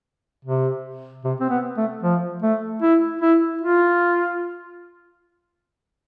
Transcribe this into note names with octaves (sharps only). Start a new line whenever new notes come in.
C3
C3
C4
B3
A3
F3
A3
E4
E4
F4